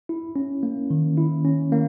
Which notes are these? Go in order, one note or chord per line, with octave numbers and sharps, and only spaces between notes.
E4
C#4
A#3
D#3
E4
C#4
A#3